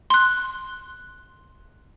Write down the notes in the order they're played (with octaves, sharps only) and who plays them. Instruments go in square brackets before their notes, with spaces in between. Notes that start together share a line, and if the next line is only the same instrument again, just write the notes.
[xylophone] C6 F#6